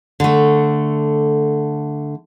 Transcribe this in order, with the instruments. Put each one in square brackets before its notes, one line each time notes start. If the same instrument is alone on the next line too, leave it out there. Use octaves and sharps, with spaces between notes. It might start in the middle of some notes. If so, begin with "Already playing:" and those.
[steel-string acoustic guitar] D3 A3